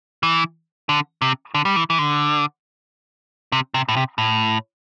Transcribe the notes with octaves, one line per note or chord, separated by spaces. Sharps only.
E3
D3
C3
D3
G3
E3
E3
D3
C3
C3
A2
C3
A2